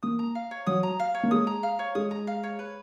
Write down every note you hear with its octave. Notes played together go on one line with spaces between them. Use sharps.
A#3 D#6
A#5
F5
C#5
F#3 D#6
A#5
F5
C#5
A#3
G#3 D#6
A#5
F5
C#5
G#3 D#6
A#5
F5
C#5
B4